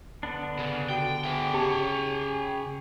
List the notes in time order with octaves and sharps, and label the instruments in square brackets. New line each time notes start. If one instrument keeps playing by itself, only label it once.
[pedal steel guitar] D3 B3 D4
[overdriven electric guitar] C#3 [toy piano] A#4
[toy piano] F#4 A4 [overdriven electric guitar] G5
[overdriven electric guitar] G#4 G5 [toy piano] A#4 C5 E5
[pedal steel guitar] C#3 C#5 [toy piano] G4 A5 A#5